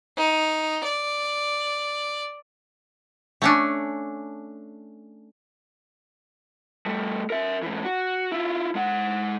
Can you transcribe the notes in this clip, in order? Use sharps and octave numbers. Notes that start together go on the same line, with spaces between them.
D#4
D5
A3 C#4 D4
G3 A3
A#4 E5
G#2 E3
F#4
E4 F4
G#3 F#5